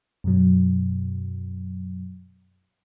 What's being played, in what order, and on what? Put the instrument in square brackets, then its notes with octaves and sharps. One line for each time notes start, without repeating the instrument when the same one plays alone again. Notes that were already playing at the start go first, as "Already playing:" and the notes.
[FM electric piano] F#2 B2 F#3